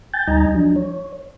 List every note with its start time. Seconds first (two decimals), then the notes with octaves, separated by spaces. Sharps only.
0.13 G5 G#5 G6 A6
0.28 D2 G3 D#4 D#5 G#5 A#5
0.55 F3 F#3 D4
0.76 C#5